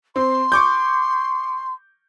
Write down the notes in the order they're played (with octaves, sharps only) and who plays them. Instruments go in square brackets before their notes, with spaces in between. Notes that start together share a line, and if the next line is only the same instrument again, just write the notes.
[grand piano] C4 [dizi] C6
[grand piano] C#6 D6 G6